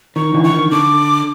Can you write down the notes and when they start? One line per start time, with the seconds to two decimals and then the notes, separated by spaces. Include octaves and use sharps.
0.16 D#3 C#6
0.34 D3 E3
0.44 C#6
0.53 D#3
0.71 D3 D6